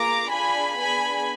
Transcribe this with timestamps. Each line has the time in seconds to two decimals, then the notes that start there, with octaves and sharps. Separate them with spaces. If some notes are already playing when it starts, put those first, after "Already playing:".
Already playing: A#3 F4 G#4 A#5 D6
0.31 D4 F4 G#4 G#5 B5
0.79 B3 D4 G#4 G#5 B5